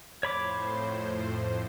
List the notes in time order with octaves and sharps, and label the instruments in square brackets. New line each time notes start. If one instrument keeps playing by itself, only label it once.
[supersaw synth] F2 A2 C5 [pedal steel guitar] C#5 B5 D6